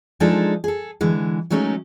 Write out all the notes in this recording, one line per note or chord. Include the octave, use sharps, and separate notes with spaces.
F3 G#3 D4 D#4 G#4 A4
G#4 A4
D3 E3 G#3
F#3 G#3 A3 C#4 D#4